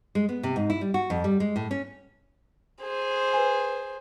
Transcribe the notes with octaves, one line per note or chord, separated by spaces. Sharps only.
G#3
B3
C3
G#2
E4
G3
F#4
F2
G3
G#3
A2
C#4
G#4 C5
B4 G#5